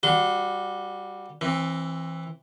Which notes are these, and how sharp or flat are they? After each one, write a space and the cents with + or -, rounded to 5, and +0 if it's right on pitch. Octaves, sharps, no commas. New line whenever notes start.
G3 +0 F#4 -25 C6 -35
E3 +0 C4 +30